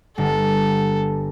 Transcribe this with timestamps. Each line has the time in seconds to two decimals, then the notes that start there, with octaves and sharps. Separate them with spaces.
0.18 G1 A4